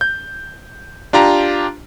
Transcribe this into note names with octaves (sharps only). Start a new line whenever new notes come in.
G6
D4 F4 G4 A#5